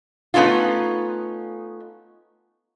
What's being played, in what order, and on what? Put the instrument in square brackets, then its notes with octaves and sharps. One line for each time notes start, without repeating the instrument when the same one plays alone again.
[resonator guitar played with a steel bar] A3 B3 C#4 D#4 F4